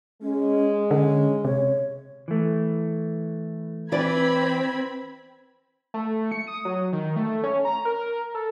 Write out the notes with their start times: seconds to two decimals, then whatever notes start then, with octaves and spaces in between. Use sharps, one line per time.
0.22 G#3 C#4
0.91 D3 C#4
1.45 C3 C#5
2.28 E3 A3
3.92 E3 C4 B4 D5 B5 G#6
5.94 A3
6.32 C#7
6.47 D#6
6.65 F#3
6.93 D#3
7.16 A3
7.44 C#4
7.65 A#5
7.85 A#4
8.35 A4